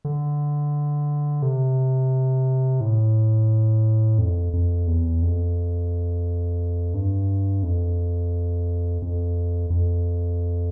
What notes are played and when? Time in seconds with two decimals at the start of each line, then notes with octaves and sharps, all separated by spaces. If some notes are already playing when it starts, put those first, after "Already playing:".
0.05 D3
1.42 C3
2.81 A2
4.18 F2
4.53 F2
4.87 E2
5.22 F2
6.94 G2
7.63 F2
9.02 F2
9.70 F2